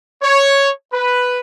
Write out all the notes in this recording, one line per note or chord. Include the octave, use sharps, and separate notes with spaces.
C#5
B4